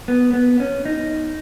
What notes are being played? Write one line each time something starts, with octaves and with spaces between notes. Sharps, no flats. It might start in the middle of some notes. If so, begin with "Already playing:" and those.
B3
B3
C#4
D#4